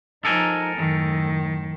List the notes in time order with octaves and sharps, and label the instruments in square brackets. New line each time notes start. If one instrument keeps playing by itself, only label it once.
[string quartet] F3 D#4 [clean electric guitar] A4 A#4 G#5
[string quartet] F#2 A2 [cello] D#3